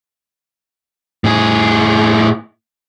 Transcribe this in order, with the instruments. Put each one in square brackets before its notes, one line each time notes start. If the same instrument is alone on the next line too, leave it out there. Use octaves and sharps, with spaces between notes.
[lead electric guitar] A2 G#4